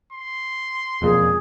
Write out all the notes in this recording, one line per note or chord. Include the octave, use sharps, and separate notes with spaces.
C6
E1 F2 A#2 G#4